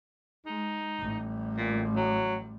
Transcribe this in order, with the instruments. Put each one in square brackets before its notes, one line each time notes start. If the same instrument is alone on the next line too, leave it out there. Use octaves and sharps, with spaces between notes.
[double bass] G#3 [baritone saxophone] D#4
[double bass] A1 G3
[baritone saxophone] A#2
F#3